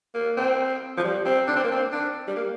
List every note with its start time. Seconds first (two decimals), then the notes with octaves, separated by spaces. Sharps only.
0.14 A#3
0.37 C4
0.97 F3
1.03 G3
1.25 C4
1.47 D4
1.56 C4
1.64 A#3
1.71 C4
1.92 D4
2.27 G3
2.36 A#3